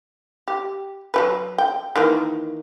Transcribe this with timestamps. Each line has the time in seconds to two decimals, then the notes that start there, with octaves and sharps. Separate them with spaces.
0.48 G4
1.14 F#3 G3 B4
1.58 G5
1.96 D#3 E3 A#3